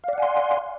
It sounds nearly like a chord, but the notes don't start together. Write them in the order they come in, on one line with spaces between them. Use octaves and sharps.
F5 D5 F#5 G#5 C6